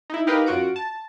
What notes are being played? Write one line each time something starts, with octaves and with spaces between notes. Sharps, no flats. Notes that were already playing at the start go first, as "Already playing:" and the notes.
D#4 E4
D#4 G4 A#4 B4 D#5 F5
F#2 F4 F#4 F#5 D7
A5